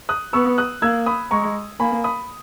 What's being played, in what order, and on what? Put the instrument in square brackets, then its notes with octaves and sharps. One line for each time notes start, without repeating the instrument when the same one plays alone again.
[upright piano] D#6 F#6
[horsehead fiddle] B3 [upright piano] C#6 E6
[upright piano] D#6 F#6
[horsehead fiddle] A#3 [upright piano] E6 G#6
[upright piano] B5 D#6
[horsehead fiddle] G#3 [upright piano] A#5 C#6
[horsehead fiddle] A#3 [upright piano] G#5 B5
[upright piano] B5 D#6